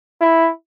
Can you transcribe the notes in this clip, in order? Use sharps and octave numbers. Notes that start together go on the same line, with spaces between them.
E4